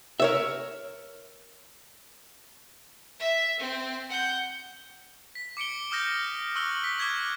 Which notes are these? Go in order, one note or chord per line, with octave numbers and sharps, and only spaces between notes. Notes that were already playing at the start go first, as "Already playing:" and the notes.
A#4 C#5 E5
E5
C4
F#5 G6
B6
D6 C#7 D7 G7
D6 D#6 F6 G6 A#6
C#6 E6 F#6 G7
B6
D6 F#6 G#6 B6